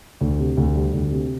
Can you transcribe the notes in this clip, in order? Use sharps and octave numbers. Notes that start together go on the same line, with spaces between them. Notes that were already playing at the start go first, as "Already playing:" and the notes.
D2
C3
D2
G3
D2
C3